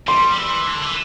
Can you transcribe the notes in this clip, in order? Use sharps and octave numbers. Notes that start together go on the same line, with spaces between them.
G3 C6
G3
E3
D3
E3